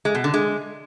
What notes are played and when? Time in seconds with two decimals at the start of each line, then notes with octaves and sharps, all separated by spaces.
0.05 G#3
0.15 B2
0.24 D3
0.34 G#3